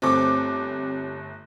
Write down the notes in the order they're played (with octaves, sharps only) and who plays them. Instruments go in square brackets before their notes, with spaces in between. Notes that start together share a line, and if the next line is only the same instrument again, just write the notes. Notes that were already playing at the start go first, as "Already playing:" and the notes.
[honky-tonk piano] G1 A3 D6 [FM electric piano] C4 [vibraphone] G4 C#5